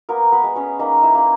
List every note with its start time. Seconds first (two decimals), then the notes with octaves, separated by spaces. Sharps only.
0.09 A#3 B3 A#4
0.32 B3 B4
0.44 G#3
0.56 C#4 C#5
0.79 A#3 D#4 D#5
1.03 E4 E5
1.15 A#3 F#5